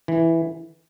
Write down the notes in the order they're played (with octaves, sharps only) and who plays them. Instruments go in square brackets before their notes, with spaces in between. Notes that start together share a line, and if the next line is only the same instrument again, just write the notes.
[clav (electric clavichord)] E3